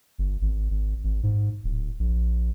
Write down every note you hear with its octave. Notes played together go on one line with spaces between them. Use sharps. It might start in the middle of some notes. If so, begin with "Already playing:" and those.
G1
G#1
G#1
G#1
G#2
D1
A#1